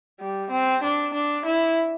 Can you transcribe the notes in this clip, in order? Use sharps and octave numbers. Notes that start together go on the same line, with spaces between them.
G3
C4
D4
D4
E4